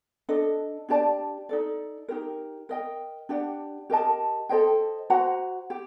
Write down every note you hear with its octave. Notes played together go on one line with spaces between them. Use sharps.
D4 A4 D#5
D4 G4 D5 A5
D#4 A4 D5
D#4 G4 A#4
A#4 D#5 G5
D4 G4 D5 F#5
G4 A#4 D#5 A5
A4 C5 D#5 G5
F#4 C5 F#5 A#5
G4